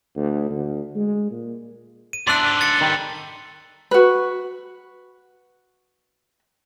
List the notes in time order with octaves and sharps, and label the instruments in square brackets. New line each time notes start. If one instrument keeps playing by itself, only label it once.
[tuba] D2
D2
G#3
A#2
[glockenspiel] D#7
[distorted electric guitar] E2 [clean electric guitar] D4 D5 [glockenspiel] C6 E6 F#6
[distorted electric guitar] G#2 D3
[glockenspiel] A6 C#7
[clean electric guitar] D#3 G3
[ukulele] F#4 B4